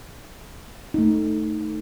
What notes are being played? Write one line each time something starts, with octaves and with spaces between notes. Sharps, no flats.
A3 D#4